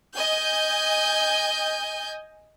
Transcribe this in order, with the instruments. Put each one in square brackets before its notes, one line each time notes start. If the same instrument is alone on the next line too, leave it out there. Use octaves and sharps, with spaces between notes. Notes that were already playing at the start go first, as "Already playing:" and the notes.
[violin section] D#5 G#5 G6